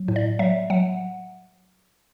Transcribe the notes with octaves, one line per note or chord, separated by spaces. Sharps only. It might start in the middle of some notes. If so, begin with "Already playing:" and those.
Already playing: F#3
A2
D5
F#3 E5
F#3 F#5